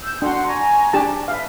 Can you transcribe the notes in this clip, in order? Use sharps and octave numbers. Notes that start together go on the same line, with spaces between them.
E6 G6
D4 F#4 F#5 C6
G#5 A#5 C#6
D4 G4 A5
B4 E5 F5